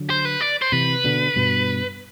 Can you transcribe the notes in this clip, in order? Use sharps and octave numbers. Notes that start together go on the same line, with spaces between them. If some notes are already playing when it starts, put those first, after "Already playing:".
Already playing: D3 F#3
C5
B4
D5
C5
C3 E3 B4
B2 D3
G2 B2